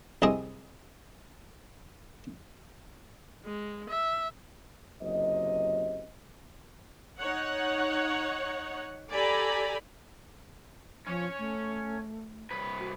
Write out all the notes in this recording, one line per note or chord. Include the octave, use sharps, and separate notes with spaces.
C2 C3 C4 G#4 D#5
G#3
E5
F#1 F#2 C3 D#5
D#4 C#5 F#5
G4 A4 D5 G#5 A#5 B5
F3 C#4 C#5
A3
C2 B4
F#4